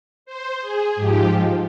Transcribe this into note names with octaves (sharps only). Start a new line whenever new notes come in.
C5
G#4
G#2 F3 G4